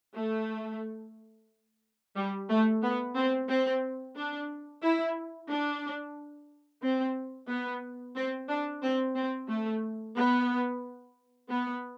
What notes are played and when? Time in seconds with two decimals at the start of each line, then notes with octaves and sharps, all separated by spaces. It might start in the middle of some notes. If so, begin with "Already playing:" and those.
0.16 A3
2.16 G3
2.49 A3
2.82 B3
3.16 C4
3.49 C4
4.16 D4
4.83 E4
5.49 D4
6.83 C4
7.49 B3
8.15 C4
8.49 D4
8.82 C4
9.15 C4
9.49 A3
10.16 B3
11.49 B3